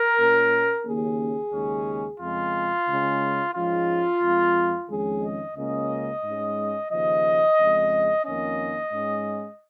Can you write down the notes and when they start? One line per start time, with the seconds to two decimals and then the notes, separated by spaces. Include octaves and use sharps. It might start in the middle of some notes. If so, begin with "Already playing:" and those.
Already playing: A#4
0.18 A#2 A#3 C#4
0.85 D#2 C#3 A#3 C#4 G#4
1.52 D#2 C#3 G#3 C#4
2.20 F2 C#3 G#3 F4
2.87 C#2 C#3 G#3
3.54 G#2 F3 G#3 C#4 F4
4.21 F2 F3 G#3
4.89 F2 D#3 G#3 C#4 G#4
5.23 D#5
5.56 C#2 C#3 A#3 C#4 D#5
6.23 G#2 G#3 C#4
6.90 D#2 C#3 F3 D#5
7.58 F2 C#3 G#3
8.25 F2 D#3 A#3 C#4 D#5
8.92 G#2 G#3 C#4